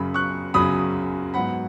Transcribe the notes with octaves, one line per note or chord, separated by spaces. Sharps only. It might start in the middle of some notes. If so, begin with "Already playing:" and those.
Already playing: F#2 C#3 F#3 B5
C#6 F#6
F#2 C#3 F#3 B5 D#6
G#2 F#3 B3 F#5 B5